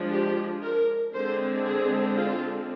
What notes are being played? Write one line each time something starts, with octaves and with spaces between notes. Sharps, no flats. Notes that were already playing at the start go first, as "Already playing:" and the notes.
Already playing: F3 G#3 D4
G4
A#4
D3 G#3 C4 C5
G#4
F4